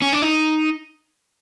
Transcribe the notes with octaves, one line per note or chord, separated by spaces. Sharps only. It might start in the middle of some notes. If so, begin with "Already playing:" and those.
C#4
D4
D#4